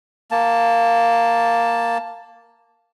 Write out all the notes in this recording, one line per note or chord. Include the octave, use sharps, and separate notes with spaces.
A#3 A5